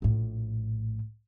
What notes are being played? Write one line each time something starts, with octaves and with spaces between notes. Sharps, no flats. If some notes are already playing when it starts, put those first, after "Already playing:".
A#1 A2